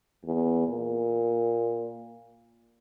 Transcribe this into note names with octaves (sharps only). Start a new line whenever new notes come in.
E2
A#2